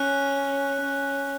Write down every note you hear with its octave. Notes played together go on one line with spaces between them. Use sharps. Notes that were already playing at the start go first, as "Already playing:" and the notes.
Already playing: C#4 F#6
C#4